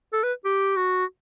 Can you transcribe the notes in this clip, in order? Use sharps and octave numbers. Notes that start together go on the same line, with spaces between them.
A4
B4
G4
F#4